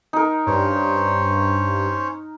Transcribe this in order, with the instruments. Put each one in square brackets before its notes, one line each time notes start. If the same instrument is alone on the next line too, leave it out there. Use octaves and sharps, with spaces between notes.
[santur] D#4 A#4
[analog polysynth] G2 [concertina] C#4 C5 C#5